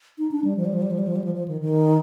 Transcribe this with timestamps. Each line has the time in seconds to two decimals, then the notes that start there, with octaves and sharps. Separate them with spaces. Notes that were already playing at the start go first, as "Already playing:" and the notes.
0.18 D#4
0.31 D4
0.44 G3
0.57 F3
0.65 G3
0.74 F3
0.82 G3
0.91 F3
0.98 G3
1.07 F3
1.16 G3
1.24 F3
1.35 F3
1.48 D#3
1.61 D#3